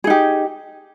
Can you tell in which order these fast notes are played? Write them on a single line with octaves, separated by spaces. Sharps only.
G#4 D#4 G4